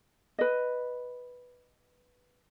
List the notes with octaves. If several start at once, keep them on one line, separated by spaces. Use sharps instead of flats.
B4 D#5